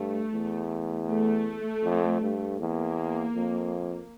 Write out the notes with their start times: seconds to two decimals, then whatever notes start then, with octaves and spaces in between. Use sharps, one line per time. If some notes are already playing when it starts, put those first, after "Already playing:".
Already playing: G2 A3
0.33 E2
1.09 A3
1.84 F2
2.22 G2
2.59 E2 A#3
3.35 F2